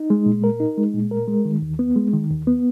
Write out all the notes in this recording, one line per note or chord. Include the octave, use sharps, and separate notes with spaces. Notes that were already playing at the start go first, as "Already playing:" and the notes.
Already playing: D#4
G#3
A#2
A#4
D#4
G#3
A#2
A#4
G#3
D#3
D#2
B3
G#3
D#3
D#2
B3